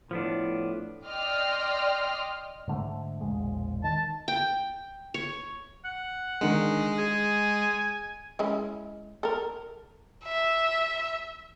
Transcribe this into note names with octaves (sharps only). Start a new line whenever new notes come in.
A2 F3 B3 D4
D5 D#5 G5 C6 F6
G#2 D3 A3
E1 A#1 G#3
D#3 A5
G5
C#5
F#5
D3 D#3 G#3
G#4 G#5
G#3 C#4 E4
A4 A#4
E5